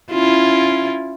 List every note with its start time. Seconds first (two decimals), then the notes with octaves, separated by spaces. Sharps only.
0.11 C#4 E4 F4